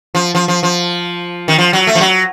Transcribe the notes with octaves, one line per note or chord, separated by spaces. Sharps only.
F3
F3
F3
F3
D#3
F3
F#3
A3
F3
F#3